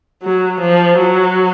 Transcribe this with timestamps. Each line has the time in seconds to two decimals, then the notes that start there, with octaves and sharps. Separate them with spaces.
0.23 F#3
0.61 F3
0.98 F#3